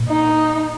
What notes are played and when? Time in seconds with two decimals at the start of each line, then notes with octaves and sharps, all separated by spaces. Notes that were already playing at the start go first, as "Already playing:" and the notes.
Already playing: A#2
0.09 D#4